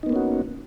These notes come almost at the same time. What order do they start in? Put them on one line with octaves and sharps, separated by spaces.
D#4 B3 A#3 C#4 F#4